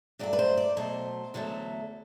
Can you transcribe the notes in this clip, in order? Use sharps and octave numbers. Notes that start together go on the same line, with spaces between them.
G2 F#3 A3 D5
B4
C5
D5
B2 F#3 A3 C5
E2 D3 F#3 A3